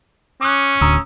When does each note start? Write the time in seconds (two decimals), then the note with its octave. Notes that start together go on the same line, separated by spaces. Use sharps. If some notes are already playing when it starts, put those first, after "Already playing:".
0.41 C#4 D6 D#6 F#6
0.81 D1 D2 A#5 D#6 E6